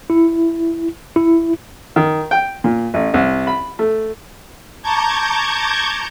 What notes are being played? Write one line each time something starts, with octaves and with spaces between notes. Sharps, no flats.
E4
E4
D#3
G5
A#2
A1
C2
B5
A3
A5 A#5 C#6 D6 G6 G#6